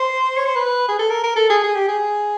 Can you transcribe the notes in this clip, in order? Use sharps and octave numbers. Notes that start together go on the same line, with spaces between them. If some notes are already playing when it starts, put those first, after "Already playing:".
Already playing: C5
C#5
C5
B4
G#4
A4
A#4
A#4
A4
G#4
G#4
G4
G#4